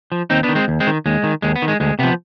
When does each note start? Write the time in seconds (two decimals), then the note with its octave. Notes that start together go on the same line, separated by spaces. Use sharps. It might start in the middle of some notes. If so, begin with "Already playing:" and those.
0.12 F3
0.30 D#2 C4 D#4
0.43 B3 D4
0.49 D#3
0.55 G#3 C4
0.68 D#2
0.80 G#3 C4
0.87 D#3
1.06 D#2 G#3
1.24 D#3
1.42 D#2 G#3
1.56 B3
1.62 D#3
1.68 G#3
1.80 D2 G#3
1.99 C3 F3 B3